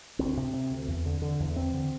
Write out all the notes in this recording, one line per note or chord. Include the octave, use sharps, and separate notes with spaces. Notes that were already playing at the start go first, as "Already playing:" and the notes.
D2 C4
C3
C3
D2
E2
D3
D3
E2
D2 C4
D3